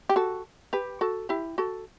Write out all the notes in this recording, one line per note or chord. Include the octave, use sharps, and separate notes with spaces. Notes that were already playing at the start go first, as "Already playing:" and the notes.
G4
F#4 A4
G4 B4
F#4 A4
E4 G4
F#4 A4